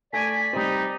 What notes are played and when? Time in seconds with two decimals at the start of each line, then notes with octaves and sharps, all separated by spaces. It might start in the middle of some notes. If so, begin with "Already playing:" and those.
0.13 A3 D5 G#5 A#6 B6 D7
0.53 G3 C4 D#4